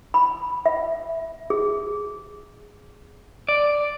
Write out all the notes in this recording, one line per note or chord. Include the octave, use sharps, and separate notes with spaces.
B5
E5
G#4
D5